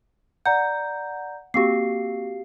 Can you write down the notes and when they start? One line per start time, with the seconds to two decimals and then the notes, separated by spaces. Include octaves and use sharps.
0.45 D5 F#5 A#5 G6
1.54 A#3 C4 F#4 G4 F5 C7